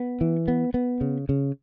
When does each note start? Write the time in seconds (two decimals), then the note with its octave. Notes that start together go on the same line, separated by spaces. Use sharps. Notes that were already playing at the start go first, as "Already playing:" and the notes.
Already playing: B3
0.21 E3
0.48 B3
0.74 B3
1.01 C#3
1.29 C#3